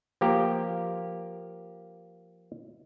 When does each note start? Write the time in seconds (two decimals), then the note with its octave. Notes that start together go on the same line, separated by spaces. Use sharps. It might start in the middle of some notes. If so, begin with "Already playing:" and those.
0.21 F3 A#3 G4 A#4